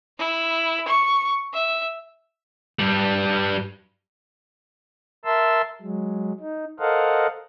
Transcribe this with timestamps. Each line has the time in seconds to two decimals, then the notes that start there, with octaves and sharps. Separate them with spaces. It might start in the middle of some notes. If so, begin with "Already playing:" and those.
0.18 E4
0.88 C#6
1.53 E5
2.79 G2 G3
5.25 A#4 E5 A5 C6 E6
5.81 F#3 G#3
6.40 D#4
6.80 A4 A#4 C5 D#5 F5 F#5